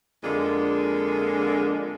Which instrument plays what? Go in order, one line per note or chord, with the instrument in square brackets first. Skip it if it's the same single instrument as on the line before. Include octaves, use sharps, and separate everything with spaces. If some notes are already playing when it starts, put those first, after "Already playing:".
[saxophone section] F2 D3 G#3 A#3 D4